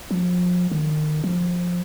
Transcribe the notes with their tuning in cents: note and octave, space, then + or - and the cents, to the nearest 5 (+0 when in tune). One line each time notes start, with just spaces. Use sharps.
F3 +35
D#3 -30
F3 +15